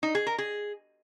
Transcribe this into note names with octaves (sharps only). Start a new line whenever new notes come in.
D#4
G#4
A#4
G#4